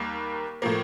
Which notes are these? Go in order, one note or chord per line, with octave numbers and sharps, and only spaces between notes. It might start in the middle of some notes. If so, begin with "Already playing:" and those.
Already playing: D#2 G3 A#3
A2 F3 A#3